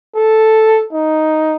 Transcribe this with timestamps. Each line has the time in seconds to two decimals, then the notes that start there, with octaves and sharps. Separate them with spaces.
0.16 A4
0.93 D#4